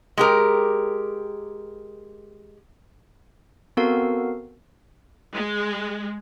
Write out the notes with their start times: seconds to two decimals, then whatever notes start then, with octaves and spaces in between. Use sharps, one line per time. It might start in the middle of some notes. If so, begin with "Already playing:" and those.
0.17 G#3 G4 A#4
3.77 B3 C4 F#4 A4 A#4 F5
5.33 G#3